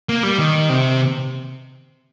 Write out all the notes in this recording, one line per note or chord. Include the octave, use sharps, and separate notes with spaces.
A#3
G3
D#3
C3